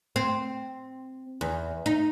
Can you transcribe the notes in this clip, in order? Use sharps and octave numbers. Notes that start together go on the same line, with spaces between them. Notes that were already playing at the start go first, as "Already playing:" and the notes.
C4
E2
D#4